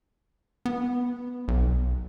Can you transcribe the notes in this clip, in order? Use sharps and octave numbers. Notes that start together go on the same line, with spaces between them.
B3
B1